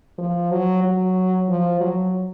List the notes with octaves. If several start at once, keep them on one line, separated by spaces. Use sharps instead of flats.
F3
F#3
F#3
F3
F#3